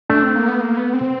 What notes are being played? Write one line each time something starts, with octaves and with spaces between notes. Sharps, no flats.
A3 D4
C4
A#3
B3
A#3
B3
C4